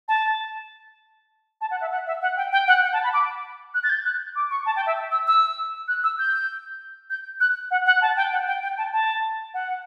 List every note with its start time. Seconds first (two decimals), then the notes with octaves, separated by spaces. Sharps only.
0.08 A5
1.61 A5
1.71 F#5
1.81 E5
1.91 F#5
2.07 E5
2.22 F#5
2.37 G5
2.53 G5
2.68 F#5
2.83 F#5
2.93 A5
3.04 B5
3.14 D6
3.74 F#6
3.84 A6
3.90 G6
4.05 F#6
4.36 D6
4.51 C#6
4.66 A5
4.76 G5
4.87 E5
5.12 E6
5.27 E6
5.88 F#6
6.04 E6
6.19 G6
7.10 G6
7.40 F#6
7.71 F#5
7.86 F#5
8.02 A5
8.17 G5
8.32 F#5
8.47 G5
8.63 G5
8.78 A5
8.93 A5
9.54 F#5